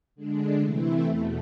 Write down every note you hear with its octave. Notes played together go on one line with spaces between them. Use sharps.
D3 G#3 D4
C3 E3 A3 C4 E4
E2 B2 A3